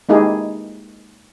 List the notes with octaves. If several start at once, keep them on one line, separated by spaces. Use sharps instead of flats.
G#3 A#3 D#4 E4 G4 G#4